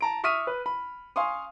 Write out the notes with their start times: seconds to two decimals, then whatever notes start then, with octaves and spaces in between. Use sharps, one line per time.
0.01 A5 A#5 D7
0.24 E5 C#6 D#6 F6 B6 D#7
0.47 B4
0.66 B5
1.16 F5 G#5 C6 C#6 D#6